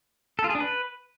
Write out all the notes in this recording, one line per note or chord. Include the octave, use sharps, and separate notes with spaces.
A4
F4
G#4
D4
B4